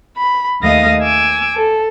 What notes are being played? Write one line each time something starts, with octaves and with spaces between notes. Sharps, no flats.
B5
D#2 A3 D#5 F5 D#6 A#6
G#5 D6 E6
A4